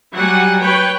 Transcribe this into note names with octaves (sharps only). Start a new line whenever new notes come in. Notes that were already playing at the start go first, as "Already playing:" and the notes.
F#3 G3 F#5 G#5
B4 C#5 G5